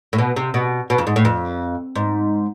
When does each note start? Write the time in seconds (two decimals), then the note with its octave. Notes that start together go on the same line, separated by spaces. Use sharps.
0.13 A2
0.18 B2
0.36 C3
0.54 B2
0.90 B2
0.98 F2
1.07 G#2
1.16 A2
1.25 F2
1.96 G#2